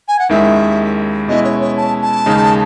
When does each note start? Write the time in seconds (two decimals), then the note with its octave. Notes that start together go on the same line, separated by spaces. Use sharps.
0.08 G#5
0.19 F#5
0.29 D#2 D#3 G#3 C#4 E4 E5
1.28 B2 G#3 C#4 E4 D#5
1.44 C#5
1.61 C#5
1.77 A5
2.02 A5
2.26 D#2 C#3 G#3 D#4